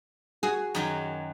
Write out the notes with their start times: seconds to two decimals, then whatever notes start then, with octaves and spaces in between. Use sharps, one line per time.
0.43 F#4 G#4
0.75 F#2 D#3 F#3